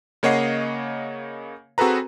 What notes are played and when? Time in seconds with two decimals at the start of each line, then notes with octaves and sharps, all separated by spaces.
0.23 C#3 A#3 C#5 D#5 F#5 C7
1.78 C4 F#4 G#4 A4 B4 A#5